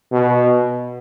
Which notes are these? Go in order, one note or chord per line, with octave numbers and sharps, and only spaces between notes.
B2